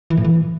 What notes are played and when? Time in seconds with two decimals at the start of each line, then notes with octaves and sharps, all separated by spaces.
0.10 E3
0.17 A2
0.24 E3